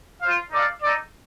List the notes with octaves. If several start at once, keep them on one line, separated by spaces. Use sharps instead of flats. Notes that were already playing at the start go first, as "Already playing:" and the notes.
F4 C5 F5
D#4 A4 D5 F5
D#4 A4 D5